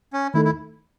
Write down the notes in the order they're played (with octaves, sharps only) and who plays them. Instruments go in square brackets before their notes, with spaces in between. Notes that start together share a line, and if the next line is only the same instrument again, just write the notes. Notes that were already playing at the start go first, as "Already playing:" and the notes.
[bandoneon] C#4
[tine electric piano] D#3 A3 D#4 A4 [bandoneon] E4
[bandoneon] E4